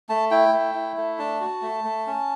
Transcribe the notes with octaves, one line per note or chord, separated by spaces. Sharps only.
A3 A5
E4 G5
A3
E4
A3
D4 A5
F#4
A3
A3
C#4